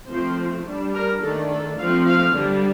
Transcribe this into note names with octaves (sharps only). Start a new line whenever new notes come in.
F3 A3 C4 C5
G3 D4
A#4
D#3 A3 D4 A4
A4
F3 A3 C4 F5
F5
D3 G3 D4